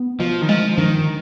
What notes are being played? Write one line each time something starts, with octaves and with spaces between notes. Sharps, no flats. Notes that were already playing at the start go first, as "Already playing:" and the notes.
Already playing: B3
B2 F3
D#3
F3 G#3
G2 D#3